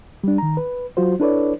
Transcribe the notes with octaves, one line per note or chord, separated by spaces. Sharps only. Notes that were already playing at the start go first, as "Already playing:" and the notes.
G3 D4
D#3 A#5
B4
F#3 F4 F#4 C5
D4 E4 A4 B4 C#5 D5